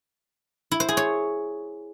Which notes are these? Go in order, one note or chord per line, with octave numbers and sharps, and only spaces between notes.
E4
C5
G#4
C#5